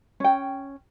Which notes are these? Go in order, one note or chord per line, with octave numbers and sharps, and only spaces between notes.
C#4 G5